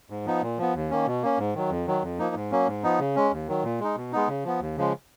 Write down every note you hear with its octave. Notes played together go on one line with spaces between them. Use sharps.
G#2
F3 B3 D#4
A#2
F3 B3
D#2
D#3 A#3 C#4
B2
A#3 C#4
G#2
D#3 F#3
F2
D#3 F#3
F2
F3 A#3 D#4
G#2
F#3 A#3 C#4
G#2
F3 B3 D#4
C#3
G#3 C#4
D#2
D#3 F#3
A#2
G#3 D#4
B2
G#3 B3 D#4
C#3
F3 B3
D#2
C#3 F3 G#3